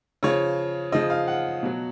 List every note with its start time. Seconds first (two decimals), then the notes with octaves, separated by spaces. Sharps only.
0.23 C#3 F3 C#5
0.92 C#3 F3 D#5
1.10 F5
1.28 F#5
1.63 B2 F#3